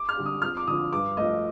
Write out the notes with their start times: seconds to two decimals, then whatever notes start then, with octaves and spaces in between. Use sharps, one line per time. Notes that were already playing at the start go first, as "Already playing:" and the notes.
Already playing: D6
0.09 F6
0.17 D3 G3
0.26 D#6
0.42 F2 F6
0.57 D6
0.67 D3 F3 D#6
0.92 G2 D6
1.17 F3 A3 D#5